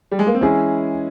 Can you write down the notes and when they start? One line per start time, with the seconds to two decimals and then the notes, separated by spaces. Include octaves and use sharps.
0.12 G3
0.19 G#3
0.27 A#3
0.35 C4
0.41 E3 G#3 C#4 E4 G#4